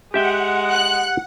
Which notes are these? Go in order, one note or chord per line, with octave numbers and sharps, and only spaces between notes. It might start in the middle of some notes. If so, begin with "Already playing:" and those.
G#3 G4 E5 F#5 G5
F#6